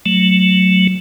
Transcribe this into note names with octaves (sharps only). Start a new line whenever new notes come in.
F#3 A3